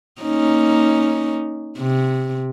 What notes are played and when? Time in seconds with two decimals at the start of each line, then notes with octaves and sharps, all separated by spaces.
0.22 A#3 C#4 D#4
1.78 C3